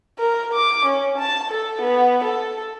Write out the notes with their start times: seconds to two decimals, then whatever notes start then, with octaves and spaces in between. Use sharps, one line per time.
0.19 A#4
0.54 D6
0.86 C#4
1.18 A5
1.50 A4
1.82 B3
2.24 A4